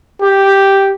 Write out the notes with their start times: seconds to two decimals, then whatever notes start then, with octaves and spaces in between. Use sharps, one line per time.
0.22 G4